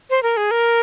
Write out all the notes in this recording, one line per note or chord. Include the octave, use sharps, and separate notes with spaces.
C5
A#4
G#4
A#4